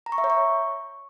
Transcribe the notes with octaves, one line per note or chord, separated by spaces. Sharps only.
A#5
C#6
E5
C#5
C#6